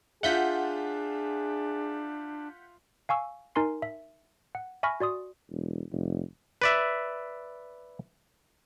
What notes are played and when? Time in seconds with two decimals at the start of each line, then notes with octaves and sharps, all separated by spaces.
0.23 D4 F4 G#4 E5 F#5 G6 B6
3.09 F5 G#5 C#6 E6
3.55 D#4 A#4 G#5 C6 C7
3.82 E5
4.55 F#5
4.83 E5 G#5 B5 C#6 F6 A#6
5.00 F#4 D5 C6 D#6
5.51 E1
5.92 F1
6.62 B4 D5 E5